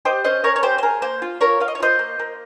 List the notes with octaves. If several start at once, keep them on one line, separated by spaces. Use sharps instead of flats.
G4 C5 D#5
C#4 C5 D#5
C#4 A#4 C#5
C#5
G4 C5
C5
G#4 A#4
A#3 C5
F4
F4 A#4 C#5
F4 F5
D#5
C#5
F4 C5 D#5
A#3
A#3